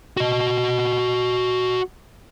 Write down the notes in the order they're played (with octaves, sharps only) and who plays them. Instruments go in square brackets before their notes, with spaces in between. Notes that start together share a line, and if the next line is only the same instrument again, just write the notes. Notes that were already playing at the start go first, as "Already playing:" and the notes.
[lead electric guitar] F#4 D#5